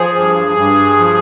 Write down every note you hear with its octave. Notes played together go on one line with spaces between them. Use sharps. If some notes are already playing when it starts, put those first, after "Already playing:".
Already playing: F3 G#4
G2
G2
F3